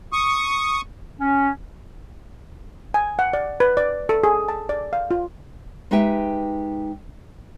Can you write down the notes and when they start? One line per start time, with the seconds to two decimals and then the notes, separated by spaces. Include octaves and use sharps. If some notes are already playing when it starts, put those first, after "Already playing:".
0.13 C#6 D#6
1.20 C#4
2.94 G#5
3.19 F#5
3.33 D5
3.60 B4
3.77 D5
4.09 A4
4.24 G#4
4.49 A5
4.69 D5
4.93 F5
5.11 F4
5.91 G#3 D#4 G4 B4 E5 G5